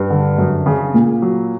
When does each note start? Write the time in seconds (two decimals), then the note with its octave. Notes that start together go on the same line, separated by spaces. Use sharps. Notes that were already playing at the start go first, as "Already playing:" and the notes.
Already playing: G2
0.10 D3
0.38 F#2
0.66 C#3
0.94 A#2
1.22 F#3